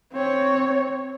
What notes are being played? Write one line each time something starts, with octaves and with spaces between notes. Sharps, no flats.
C4 C#5